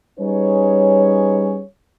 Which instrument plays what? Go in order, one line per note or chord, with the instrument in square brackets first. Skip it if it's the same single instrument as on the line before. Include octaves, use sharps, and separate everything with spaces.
[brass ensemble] G3 C#4 D#4 G#4 B4 C#5